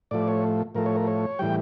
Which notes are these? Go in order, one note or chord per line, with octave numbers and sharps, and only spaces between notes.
A2 F3 A3 D5
C#5
A2 F3 A3 A#4
C#5
A#4
C#5
A2 E3 G3 G5